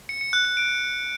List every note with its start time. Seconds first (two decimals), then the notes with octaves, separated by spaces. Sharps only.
0.09 C#7
0.21 C#7
0.33 F#6
0.45 F#6
0.57 D7